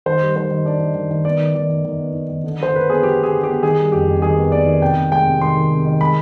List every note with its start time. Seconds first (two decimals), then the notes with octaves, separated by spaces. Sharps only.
0.06 D#3 C5
0.21 G3
0.36 D#3 C5
0.51 D#3
0.65 D4 D5
0.80 D#3
0.95 D#3
1.11 D#3
1.25 B3 D5
1.40 D#3
1.55 D#3 D5
1.69 D#3
1.85 D#3
1.99 B3
2.14 D#4
2.29 D#3
2.44 D3
2.59 F3 C5
2.74 D3 B4
2.89 B3 G#4
3.03 F3 G4
3.19 B3 G#4
3.33 D3
3.43 B3 G4
3.62 D#3 G#4
3.78 G3
3.92 F2 G4
4.08 F2
4.22 D#3 G#4
4.37 B3
4.52 B3 D5
4.66 D#3
4.82 C3 G5
4.97 C3
5.11 G#3 G5
5.26 C3
5.41 D#3 C6
5.57 D#3
5.71 C3
5.86 D#3
6.01 G#3 B5